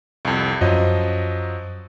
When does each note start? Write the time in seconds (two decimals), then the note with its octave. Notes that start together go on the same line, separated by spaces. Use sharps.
0.25 C2 F2
0.61 F#2 F3 F#3 C#4 D#5